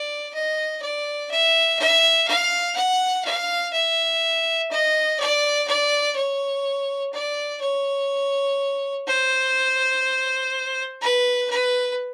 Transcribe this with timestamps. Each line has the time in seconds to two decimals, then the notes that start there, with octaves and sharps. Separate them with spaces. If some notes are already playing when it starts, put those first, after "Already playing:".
Already playing: D5
0.34 D#5
0.82 D5
1.30 E5
1.79 E5
2.28 F5
2.76 F#5
3.25 F5
3.73 E5
4.71 D#5
5.20 D5
5.68 D5
6.16 C#5
7.13 D5
7.62 C#5
9.07 C5
11.01 B4
11.50 B4